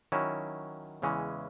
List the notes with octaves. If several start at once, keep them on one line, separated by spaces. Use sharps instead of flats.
D#3 F#3 C#4 E4
E2 C#3 E3 G#3 C#4